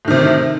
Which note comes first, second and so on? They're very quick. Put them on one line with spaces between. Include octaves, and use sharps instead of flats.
A2 D#3 C3